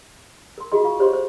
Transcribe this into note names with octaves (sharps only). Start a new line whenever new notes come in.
A#4 C6
F4 F#4 G#4 D#5 C6
F4 F5 C#6
G4 C5 C#5 D#5 C6 C#6
C5